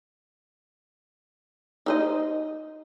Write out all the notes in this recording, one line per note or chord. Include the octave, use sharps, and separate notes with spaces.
D#4 C5 D#5